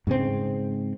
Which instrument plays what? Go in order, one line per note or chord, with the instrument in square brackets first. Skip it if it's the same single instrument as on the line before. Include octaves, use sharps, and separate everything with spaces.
[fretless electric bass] G#2 C#3 G#3 C4